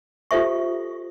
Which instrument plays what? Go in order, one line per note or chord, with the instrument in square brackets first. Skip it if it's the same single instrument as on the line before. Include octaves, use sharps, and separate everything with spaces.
[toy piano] F4 G4 A4 C5 E5 C#6